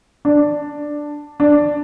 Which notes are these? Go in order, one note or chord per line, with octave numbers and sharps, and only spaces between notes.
D4
D4